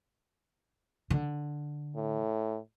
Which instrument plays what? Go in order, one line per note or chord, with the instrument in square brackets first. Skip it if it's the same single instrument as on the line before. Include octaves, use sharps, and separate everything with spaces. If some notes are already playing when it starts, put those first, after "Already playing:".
[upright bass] D3
[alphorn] A2